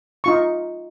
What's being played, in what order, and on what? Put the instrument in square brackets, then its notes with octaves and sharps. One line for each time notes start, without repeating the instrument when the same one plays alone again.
[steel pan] D#4 F4 C#6